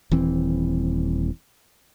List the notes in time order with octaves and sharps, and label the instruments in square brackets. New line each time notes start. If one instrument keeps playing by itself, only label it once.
[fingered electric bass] D#1 E3 C4